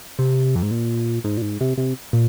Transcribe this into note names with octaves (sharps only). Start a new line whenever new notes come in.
C3
F2
G#2
A#2
G#2
A#2
G#2
C3
C3
A#2